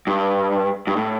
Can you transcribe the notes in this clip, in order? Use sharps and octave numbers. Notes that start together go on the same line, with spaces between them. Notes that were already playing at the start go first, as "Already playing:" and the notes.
G2
G2
A2